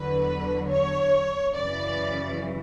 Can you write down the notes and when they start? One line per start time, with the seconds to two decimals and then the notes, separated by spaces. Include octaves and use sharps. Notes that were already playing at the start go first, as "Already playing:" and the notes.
Already playing: E2 D3 F#3 B4
0.67 C#5
1.54 F#2 C#3 E3 D5